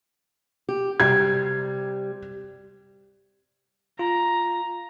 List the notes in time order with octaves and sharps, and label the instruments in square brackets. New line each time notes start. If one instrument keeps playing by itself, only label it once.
[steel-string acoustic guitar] G4
[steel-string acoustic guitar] C3 G3 [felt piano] G#6
[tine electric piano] F4 [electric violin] A#5